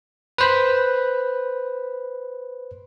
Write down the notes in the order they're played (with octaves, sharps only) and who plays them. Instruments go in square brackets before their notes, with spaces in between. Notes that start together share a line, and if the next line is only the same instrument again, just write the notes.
[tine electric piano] B4 C5 B5